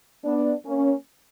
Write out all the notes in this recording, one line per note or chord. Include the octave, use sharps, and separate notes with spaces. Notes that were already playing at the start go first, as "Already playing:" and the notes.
B3 D4
A#3 C#4